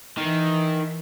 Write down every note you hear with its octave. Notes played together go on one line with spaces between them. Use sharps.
D#3 E3